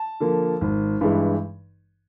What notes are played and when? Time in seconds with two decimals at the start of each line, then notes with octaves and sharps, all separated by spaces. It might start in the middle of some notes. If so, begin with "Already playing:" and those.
Already playing: A5
0.20 D3 F3 A#3
0.61 G#1
1.01 G2 E3 G#3